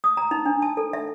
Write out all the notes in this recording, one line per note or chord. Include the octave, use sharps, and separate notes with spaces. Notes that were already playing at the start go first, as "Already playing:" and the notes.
D#6
A#5
D#4
D4
A5
A4
E5